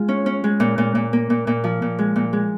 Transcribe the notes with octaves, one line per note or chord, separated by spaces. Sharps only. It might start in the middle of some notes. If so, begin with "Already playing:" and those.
Already playing: G#3 F4
C#4
C#4
G#3
A#2
A#2
A#2
A#3
A#2
A#2
F3
A#2
G#3
A#2
G#3